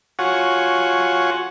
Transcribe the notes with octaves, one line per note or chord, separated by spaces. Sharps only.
F4 F#4 C#5 F#5 G#5